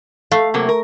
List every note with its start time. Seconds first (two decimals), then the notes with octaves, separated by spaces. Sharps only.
0.32 A3 F5
0.54 C3 F#3 A#3
0.69 A#4